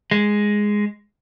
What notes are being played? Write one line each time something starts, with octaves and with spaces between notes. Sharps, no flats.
G#3